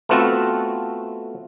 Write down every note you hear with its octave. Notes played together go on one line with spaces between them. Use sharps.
A3 B3 C4 F4 F#4 A4